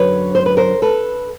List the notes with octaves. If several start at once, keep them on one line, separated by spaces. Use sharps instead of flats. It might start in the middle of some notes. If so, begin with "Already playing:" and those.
Already playing: F#2 D3 F#3 B4 C#5
C5
B4
A#4 C5
A4 B4